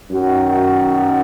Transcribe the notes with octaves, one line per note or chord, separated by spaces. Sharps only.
F#2 D#3 F#4